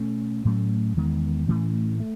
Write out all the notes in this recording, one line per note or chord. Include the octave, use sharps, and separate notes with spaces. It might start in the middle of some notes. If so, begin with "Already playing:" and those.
Already playing: B2 A3 C#4
A2 F#3 A3 C#4
E2 D#3 G#3 B3
A2 E3 A3 C#4
A3